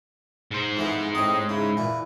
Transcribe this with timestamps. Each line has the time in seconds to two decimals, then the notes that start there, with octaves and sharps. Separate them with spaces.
0.51 G#2 C5
0.77 F2 E3 B3
1.15 A2 C4 D#5 C6 D#6
1.49 C#3 E4
1.77 A#2 E3